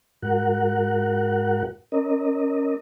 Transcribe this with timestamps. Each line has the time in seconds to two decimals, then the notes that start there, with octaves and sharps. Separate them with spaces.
0.22 G#2 F#4 A#4 F#5
1.92 C#4 A#4 D#5